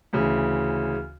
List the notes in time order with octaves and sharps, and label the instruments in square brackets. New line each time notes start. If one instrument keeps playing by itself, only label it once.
[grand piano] D2 C#3 E3